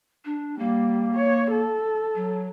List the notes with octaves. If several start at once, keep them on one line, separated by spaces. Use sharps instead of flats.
D4
G3 A#3
C#5
A4
F#3